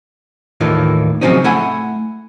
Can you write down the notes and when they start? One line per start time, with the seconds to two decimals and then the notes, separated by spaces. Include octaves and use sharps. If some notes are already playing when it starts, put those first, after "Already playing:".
0.60 D#2 A2 D#3 E3 F4
1.21 C#3 F3 F#3 C4 C#4 D#4
1.44 A3 E4 F#5 G#5